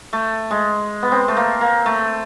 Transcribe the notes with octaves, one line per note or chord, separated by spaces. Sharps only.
A3
G#3
B3
C4
A3
A#3
A#3
A3